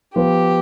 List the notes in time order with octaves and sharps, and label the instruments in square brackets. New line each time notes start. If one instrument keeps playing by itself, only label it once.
[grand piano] F3 B3 F4 B4 [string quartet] G4